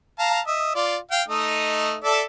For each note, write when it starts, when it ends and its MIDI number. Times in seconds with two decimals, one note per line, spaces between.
0.19 0.40 77
0.19 0.40 81
0.19 0.40 82
0.47 0.73 75
0.47 0.73 76
0.75 0.97 65
0.75 0.97 74
1.11 1.22 77
1.11 1.22 79
1.28 1.97 57
1.28 1.97 63
1.28 1.97 75
2.04 2.22 69
2.04 2.22 74
2.04 2.22 76